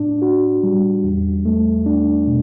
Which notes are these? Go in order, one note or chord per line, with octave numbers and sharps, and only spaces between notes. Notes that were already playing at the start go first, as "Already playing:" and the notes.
Already playing: A2 D4
F#4
G3
E2
A3
D4
B2